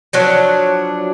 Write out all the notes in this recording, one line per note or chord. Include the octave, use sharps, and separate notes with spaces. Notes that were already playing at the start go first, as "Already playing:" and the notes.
F3 F#3 D4 C#5